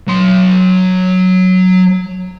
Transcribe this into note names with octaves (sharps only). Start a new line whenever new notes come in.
F#3 C6